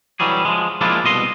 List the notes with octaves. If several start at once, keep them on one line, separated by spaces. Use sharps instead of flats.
E3 F#3 G3 G#4
F3 G#3
F3 G#3 A#3 D4 E4 F4
C2 B2 D#5 C6